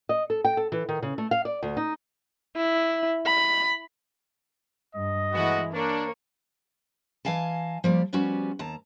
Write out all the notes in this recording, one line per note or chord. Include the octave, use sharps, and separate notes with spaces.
D#5
A4
G5
A4
E3
D#3
C#3
A3
F5
D5
D2
D#4
E4
B5
G2 D#5
E3 G#3 A3 B3 E4 F#4
A#3 D4 C#5
E3 D#5 F5 G#5 A5
F3 G3 A#3
F3 G3 B3 C#4 F#4
D#2 A5 A#5